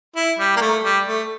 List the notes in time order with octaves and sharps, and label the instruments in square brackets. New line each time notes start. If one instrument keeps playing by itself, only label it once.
[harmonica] E4
G3
A#3
A3
G3
A3